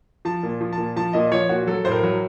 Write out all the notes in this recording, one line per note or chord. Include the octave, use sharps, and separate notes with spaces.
F3 A5
A#2
F3
A5
A#2
F3 A5
A#2 D#5
F3 C#5
A#2 F#4
F#3 A4
A2 C5
A#4
F#3